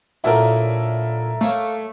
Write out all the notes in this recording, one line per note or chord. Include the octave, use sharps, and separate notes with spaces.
D2 A#2 F#3 E4 A4 A#4
A3 A#3 C#5 F5